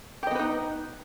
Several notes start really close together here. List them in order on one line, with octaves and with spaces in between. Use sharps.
G4 D#5 B3 B4 D#4